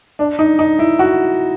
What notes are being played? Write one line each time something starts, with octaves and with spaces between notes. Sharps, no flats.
D4
D#4
D#4
E4
F#4